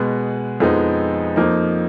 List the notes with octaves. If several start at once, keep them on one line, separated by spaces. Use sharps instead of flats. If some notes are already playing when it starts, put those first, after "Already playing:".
Already playing: B2 G#3 B3
F2 F3 G#3 B3 D#4
F2 F3 A#3 D#4